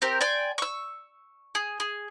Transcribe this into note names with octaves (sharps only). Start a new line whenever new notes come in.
C4 G4 A#4
D5 G5 G#5 C6
C#6 E6
G#4
G#4